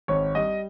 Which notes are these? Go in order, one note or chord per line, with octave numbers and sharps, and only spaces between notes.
G#1 C#5
G3 D#5